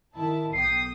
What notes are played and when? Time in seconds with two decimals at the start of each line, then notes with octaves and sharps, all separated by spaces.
0.14 D#3 E4 A5
0.53 B1 G5 D#6 C7